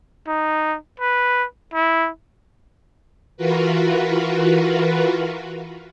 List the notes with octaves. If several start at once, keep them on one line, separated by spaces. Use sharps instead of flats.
D#4
B4
E4
E3 F4 F#4 A#4 B4